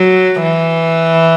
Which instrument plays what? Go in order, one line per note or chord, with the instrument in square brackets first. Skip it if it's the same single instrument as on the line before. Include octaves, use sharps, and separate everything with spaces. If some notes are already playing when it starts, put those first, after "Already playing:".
Already playing: [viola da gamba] F#3
E3